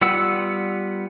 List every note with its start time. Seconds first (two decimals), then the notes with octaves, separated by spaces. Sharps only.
0.01 G3 B3 F4 F#5 E6